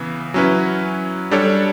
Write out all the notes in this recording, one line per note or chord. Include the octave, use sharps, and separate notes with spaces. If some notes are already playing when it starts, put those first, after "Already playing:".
Already playing: C#3 E3 B3
F#3 C#4 E4 B4
G3 D4 A4 C#5